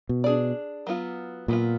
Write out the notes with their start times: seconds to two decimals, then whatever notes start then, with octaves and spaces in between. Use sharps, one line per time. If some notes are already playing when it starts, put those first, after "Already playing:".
0.09 B2
0.24 D4 G#4 D5
0.87 F#3 B3 F4
1.48 A#2 F#3 B3 F4